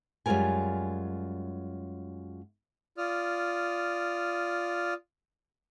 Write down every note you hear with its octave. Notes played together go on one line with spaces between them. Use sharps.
F#2 G3 G#3 F4 A#4 G#5
F4 D5 D#6 F6